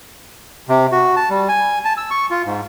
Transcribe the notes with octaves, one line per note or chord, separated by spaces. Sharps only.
C3
F#4
A5
G3
G#5
A5
E6
C#6
F4
G#2